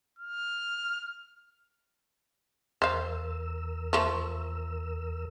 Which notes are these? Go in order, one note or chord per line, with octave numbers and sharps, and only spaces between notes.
F6
E2 A#4 C5 F5 E6
F3 A3 A#3